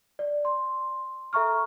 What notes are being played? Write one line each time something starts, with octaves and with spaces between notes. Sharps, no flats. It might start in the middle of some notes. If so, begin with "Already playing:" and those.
D5
C6
A4 E5 A#5 C#6 F6